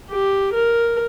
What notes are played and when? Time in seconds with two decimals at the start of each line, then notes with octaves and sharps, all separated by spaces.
0.11 G4
0.54 A#4